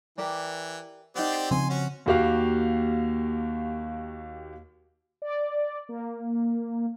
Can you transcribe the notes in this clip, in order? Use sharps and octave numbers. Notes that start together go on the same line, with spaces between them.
E3 G4 A#4 D5
C4 D#4 G4 D5 F#5
C#3 F3 C4 G#5 C6
C#4 F#4
D#2 A#3 F#4 G4 F5
D5
A#3